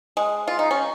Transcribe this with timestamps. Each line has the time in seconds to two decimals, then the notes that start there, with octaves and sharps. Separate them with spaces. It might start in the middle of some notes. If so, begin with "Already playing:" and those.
0.17 G#3
0.48 F4
0.59 D#4
0.71 C#4